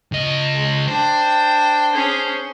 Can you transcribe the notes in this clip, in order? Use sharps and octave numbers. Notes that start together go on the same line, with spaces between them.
C#3 D#5
G#3
D4 C5 G5
C#4 G#4